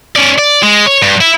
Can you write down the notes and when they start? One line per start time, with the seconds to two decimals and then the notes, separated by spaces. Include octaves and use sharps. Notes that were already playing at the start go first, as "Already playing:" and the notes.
0.16 C#4 D5
0.38 D5
0.63 G#3
0.86 C#5
1.02 G2
1.21 E4